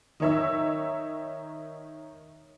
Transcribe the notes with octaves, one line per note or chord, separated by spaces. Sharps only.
D#3 D#4 C#5 E5 E6